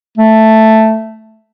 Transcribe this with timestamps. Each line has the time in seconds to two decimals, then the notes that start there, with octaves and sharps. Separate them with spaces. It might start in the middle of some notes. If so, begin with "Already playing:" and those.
0.18 A3